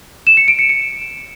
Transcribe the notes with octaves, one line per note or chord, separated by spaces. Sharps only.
E7
C#7
D7
C#7
C#7